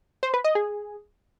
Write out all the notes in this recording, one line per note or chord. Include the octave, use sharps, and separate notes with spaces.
C5
B4
D#5
G#4